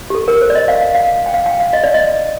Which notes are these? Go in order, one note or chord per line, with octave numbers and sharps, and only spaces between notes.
G4
A4
A#4
C5
D5
D#5
F5
F5
G5
F5
G5
F5
D#5
D5
D#5